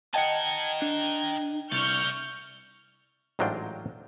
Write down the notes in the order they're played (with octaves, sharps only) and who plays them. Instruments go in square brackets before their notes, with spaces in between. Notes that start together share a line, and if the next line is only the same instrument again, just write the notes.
[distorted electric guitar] D#4 A#4 [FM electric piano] D#5 G5 G#6 [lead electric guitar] F#5 A5
[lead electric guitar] D4
[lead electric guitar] C2 [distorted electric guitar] D5 E5 [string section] C#6 F6 G6
[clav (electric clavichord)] A1 G#2 F#3 D4 F4 G5